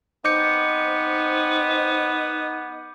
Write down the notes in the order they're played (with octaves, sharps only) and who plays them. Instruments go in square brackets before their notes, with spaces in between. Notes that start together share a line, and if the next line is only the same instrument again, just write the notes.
[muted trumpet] B3 [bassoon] C4 [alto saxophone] D#4 [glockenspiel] D6 G6 C#7